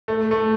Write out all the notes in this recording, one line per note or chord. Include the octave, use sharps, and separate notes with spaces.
A3
A3